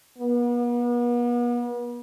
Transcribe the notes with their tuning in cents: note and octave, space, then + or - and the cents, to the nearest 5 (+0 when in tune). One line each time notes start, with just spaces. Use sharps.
B3 -40